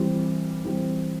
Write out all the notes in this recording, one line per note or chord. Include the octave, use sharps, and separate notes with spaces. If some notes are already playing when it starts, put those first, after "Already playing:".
Already playing: E3 G3 C4
E3 G3 C4